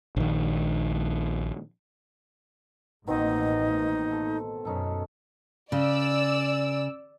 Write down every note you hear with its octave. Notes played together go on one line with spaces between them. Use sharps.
A#1 D#3
A1 B2 D#3 A#3 C4 D#4
A4
F#2 B2 C#4 D#4 A4
C#3 D5 E6